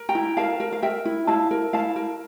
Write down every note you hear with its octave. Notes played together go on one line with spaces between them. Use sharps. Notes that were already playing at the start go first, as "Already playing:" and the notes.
Already playing: A#4
G5 A#5
E4
A#4 F5 A5
A#4
F5
A#4 E5 G5
E4
E4 F5 A5
A#4
E4 F5 A5
A#4